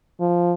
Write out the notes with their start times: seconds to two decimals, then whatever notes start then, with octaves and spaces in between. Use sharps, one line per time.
0.20 F3